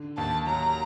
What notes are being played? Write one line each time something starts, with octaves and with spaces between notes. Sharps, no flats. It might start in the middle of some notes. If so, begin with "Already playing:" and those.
Already playing: D3
D#2 A5
F#3 A#5